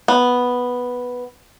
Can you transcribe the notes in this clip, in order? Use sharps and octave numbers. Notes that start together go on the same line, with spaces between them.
B3